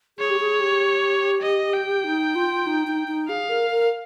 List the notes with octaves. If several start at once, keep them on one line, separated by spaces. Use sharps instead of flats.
G#4 C#5
G4
G#4
G4
D#5
G5
D#4
F4
D#4
D#4
D#4
G#4 F5
A#4
A#4